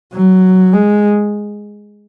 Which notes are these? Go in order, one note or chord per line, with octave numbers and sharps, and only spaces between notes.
F#3
G#3